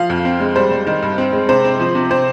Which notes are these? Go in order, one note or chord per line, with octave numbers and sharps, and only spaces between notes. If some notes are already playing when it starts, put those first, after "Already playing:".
Already playing: F3 F5
F2
C4
G#3
G3 C5
G3
D#3
G2
C4
G#3
C3 C5
C4
F3
C3
C4 C5